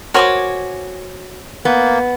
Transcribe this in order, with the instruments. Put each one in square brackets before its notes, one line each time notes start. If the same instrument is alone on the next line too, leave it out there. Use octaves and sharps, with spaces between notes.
[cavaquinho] F#4 G#5 D6 [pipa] A#4 C5 C#5
[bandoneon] A#3 [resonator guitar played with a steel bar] B3